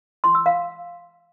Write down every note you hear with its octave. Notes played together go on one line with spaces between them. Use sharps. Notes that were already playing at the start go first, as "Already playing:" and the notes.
C6
E6
F5